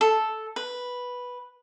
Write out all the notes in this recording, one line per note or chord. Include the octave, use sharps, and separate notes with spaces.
A4
B4